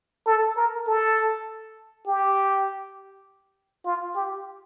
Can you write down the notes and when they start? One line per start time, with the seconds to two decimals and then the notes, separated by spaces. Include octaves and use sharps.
0.27 A4
0.57 A#4
0.87 A4
2.07 G4
3.86 F4
4.16 G4